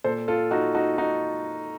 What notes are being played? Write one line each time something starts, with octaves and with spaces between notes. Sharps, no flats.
A#2 A4 C5
F4 A4
D#4 F#4
D#4 F#4
D#4 F#4